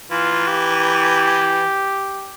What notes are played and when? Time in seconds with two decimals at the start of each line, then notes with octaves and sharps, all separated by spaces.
0.11 E3 F4
0.48 G4